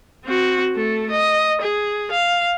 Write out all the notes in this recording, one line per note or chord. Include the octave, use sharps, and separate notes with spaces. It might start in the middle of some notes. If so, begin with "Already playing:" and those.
C4 F#4
A3 A4
D#5
G#4
F5